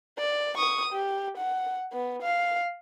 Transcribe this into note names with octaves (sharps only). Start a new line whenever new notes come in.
D5
C#6 D#6
G4
F#5
B3
F5